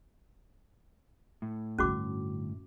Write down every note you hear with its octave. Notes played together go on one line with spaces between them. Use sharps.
A2
G2 D3 C#4 F#4 D6